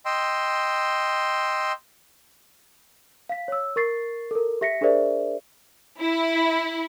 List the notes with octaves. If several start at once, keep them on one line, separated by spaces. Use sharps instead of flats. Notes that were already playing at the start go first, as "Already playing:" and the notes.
D#5 G5 C6 E6
F5 B6
C#5 E6
A#4 C#6 A6 C7
A4 A#4
G4 E5 A#6 B6 C#7
D4 G#4 A#4 C5 D5 E5
E4